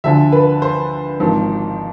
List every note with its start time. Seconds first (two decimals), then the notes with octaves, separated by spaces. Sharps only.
0.04 D2 D3 F3 E5
0.32 B4
0.62 C5
1.20 G#1 G#2 F3